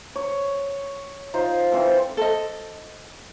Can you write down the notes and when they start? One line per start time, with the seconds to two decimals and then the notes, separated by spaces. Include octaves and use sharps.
0.16 C#5
1.34 D#4 F4 C5
1.72 E3 C4 A4
2.17 A4 C5 D#5